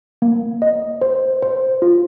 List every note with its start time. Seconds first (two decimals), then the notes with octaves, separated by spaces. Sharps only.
0.22 A#3
0.62 D#5
1.01 C5
1.42 C5
1.82 F4